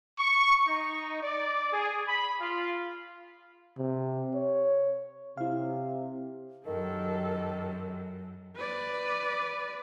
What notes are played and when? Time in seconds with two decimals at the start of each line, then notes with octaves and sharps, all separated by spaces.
0.19 C#6
0.66 D#4
1.23 D5
1.72 G#4
2.07 B5
2.40 F4
3.77 C3
4.34 C#5
5.37 C3 E4 F5
6.66 F#2 D#3 G4 A4 A#4
8.56 B4 D5